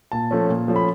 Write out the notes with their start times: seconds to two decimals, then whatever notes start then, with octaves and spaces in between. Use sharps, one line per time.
0.12 A#2 A5
0.31 F3 A3 C#4
0.49 A#2
0.68 F3 A3 C#4
0.76 B5